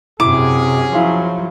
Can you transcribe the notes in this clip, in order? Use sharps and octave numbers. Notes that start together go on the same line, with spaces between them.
F#2 C3 C#4 E4 F#4 G#4 D6
F3 F#3 E4 F5 C6